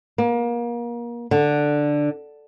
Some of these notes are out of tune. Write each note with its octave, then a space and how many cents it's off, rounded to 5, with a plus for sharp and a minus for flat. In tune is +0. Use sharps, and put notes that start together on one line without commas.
A#3 +30
D3 +5